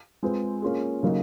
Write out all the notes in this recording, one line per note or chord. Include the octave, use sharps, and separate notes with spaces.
G#3 C4 F4 G#4 B4
A#3 C#4 F4 G#4
C#3 F#3 A#3 D#4